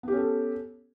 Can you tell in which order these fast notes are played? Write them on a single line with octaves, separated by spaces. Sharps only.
B3 G4 C#4 A4